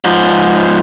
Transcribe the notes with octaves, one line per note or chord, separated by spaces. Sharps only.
G#2 F3